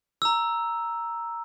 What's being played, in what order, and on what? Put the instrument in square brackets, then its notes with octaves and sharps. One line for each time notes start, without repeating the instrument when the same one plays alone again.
[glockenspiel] A#5 E6